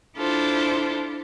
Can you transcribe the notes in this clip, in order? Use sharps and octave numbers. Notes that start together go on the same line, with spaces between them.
D4 E4 F4 A4 C5